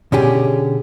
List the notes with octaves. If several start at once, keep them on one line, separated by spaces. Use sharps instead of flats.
B2 D3 C#4 G4 G#4